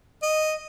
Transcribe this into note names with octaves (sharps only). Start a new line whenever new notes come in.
D#5